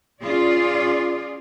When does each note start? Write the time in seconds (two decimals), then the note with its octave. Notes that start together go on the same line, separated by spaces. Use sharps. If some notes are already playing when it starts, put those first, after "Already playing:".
0.22 C#4 F4 G#4 D5